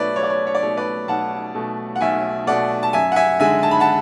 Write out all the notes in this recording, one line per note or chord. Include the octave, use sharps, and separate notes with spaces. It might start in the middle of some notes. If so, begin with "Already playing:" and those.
Already playing: B1 B2 A3 B4 C#5 D5 E5
B1 C#5
D5
C#5
C#5
D5
B2 A3 C#5
B4 D5
B1 F#5 A5
B2 A3
F#5
B1 E5 G#5
B2 A3 D5 F#5
A5
F#2 E5 G#5
F#5
E5 G#5
D3 G#3 E5 G#5
A5
B5
F#5 A5